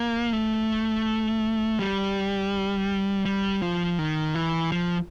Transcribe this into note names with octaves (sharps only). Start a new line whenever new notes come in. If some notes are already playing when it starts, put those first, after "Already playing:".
Already playing: A#3
A3
G3
G3
F3
D#3
E3
F3